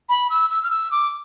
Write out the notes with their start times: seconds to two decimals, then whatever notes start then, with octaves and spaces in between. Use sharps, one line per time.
0.09 B5
0.30 E6
0.50 E6
0.63 F6
0.70 E6
0.91 D6